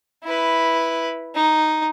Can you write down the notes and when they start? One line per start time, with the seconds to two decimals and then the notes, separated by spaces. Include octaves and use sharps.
0.24 E4 B4
1.35 D#4